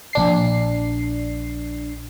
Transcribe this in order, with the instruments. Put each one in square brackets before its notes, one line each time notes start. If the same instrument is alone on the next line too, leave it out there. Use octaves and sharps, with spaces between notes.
[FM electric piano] A#1 D4 C7